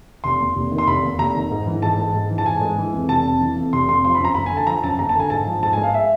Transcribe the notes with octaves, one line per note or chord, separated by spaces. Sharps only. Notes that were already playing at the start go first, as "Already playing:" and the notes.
F1 C6
D#2
F1
D#3
C6
F1 B5
D#2
F1 A#5
D#3
G#2
E3
G#2 A5
G#3
G#2
E3
A5
G#2 G#5
G#3
E3
F2
F1 A5
C3
E3
F2
F1 C6
C3 C6
F3 C6
B5
F#2 A#5
F#1 B5
D3 G#5
A5
F3 A#5
F#2 A5
F#1 A#5
A5
D3 G#5
G#2 A5
F3
G#2 A5
G#5
G#3
F5
E5